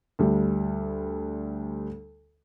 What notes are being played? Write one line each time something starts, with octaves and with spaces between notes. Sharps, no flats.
D2 G3